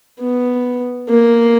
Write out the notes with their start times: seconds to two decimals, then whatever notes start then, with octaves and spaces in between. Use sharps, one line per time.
0.20 B3
1.10 A#3